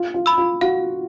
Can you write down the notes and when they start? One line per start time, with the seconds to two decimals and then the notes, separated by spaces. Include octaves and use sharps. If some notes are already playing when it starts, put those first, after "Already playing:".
Already playing: F4
0.14 F4
0.26 B5 E6
0.38 F4
0.61 F#4 F5